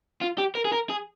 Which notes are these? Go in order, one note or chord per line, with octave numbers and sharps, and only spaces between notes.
F4
G4
A#4
G#4
A#4
G#4